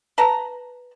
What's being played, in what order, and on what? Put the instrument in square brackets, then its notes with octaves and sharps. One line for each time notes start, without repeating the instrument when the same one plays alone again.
[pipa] B4 A5 A#5